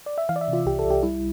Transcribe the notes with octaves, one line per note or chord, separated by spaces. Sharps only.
D5
E5
E3 F5
D5
E5
C3
F4
C2 G4
A4
C2
G4
G3 E4